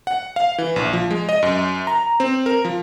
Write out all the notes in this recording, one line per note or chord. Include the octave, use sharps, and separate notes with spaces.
F#5
F5
E3
A#1
F3
G#3
D#5
F#2
A#5
C4
A#4
F3